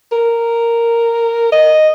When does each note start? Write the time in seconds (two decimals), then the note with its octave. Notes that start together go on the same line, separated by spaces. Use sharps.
0.12 A#4
1.52 D#5